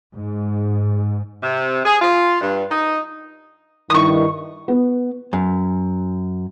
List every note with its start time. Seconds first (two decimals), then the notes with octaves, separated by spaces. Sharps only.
0.14 G#2
1.43 C3
1.85 G#4
2.01 F4
2.41 G2
2.70 D#4
3.90 G2 D#3 E4 C#6 D#6
4.68 B3
5.33 F#2